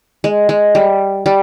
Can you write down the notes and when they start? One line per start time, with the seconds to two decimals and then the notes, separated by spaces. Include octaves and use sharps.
0.24 G#3
0.49 G#3
0.75 G3
1.26 G3